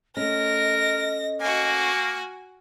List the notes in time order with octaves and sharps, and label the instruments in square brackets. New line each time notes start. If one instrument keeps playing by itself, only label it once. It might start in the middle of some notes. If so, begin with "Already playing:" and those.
[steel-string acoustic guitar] A3 C#4 [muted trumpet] A#4 [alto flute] D#5 [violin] A#6
[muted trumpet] A#3 [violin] F#4 G#5